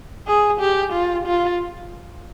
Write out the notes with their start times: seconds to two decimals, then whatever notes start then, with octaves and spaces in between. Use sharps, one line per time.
0.27 G#4
0.60 G4
0.93 F4
1.26 F4